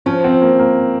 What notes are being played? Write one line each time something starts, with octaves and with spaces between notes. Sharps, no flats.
F3 C#4
C4
A#3
A#3